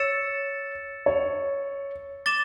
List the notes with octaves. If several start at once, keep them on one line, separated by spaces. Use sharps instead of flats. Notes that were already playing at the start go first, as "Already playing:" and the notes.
Already playing: C#5 E6 A6 C#7 E7
C#5
D6 A6 E7 G7